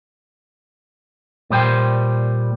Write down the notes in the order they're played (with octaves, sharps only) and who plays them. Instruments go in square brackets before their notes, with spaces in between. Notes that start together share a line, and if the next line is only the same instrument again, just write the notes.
[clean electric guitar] A#2 G3 C5 G5